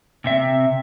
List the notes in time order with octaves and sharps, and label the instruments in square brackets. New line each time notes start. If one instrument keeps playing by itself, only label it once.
[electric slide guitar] C3 C4 E5